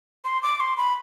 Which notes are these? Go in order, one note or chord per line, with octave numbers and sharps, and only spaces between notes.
C6
D6
C6
B5